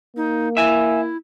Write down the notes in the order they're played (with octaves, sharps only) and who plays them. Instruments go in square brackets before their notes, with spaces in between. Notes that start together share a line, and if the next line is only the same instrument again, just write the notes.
[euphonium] A#3 [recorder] D#4
[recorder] E4 [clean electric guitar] E5 G#5